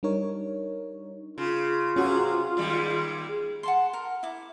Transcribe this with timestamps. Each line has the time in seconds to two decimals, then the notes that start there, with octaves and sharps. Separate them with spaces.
0.03 G3 D4 D#4 A#4 C#5
1.38 C#3 F4
1.96 C3 C#4 F#4 G#4
2.57 D#2 G3 G#3
3.63 F#5 A5 C6
3.93 A#4
4.23 E4 D6